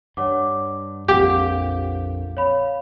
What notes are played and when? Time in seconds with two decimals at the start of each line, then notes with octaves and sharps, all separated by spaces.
0.17 G2 C#5 F#5 D6
1.08 A#1 F2 A#2 G4 F5 F#5
2.37 C#5 F5 B5